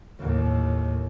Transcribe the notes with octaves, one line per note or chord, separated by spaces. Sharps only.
D#2 A2